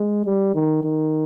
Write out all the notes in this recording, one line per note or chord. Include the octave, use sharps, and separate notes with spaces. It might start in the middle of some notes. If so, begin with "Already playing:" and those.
Already playing: G#3
G3
D#3
D#3